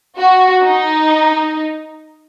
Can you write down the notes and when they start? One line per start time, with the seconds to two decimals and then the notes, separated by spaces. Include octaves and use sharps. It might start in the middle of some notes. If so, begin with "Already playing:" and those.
0.17 F#4
0.63 D#4